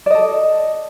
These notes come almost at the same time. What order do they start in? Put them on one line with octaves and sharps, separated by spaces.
D5 D#5 A4